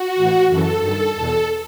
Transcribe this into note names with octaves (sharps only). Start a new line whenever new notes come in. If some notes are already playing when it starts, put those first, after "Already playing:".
Already playing: F#4
A2 E3
F#2 C#3 E3 A4
G2 D#3 A4
E2 B2 A4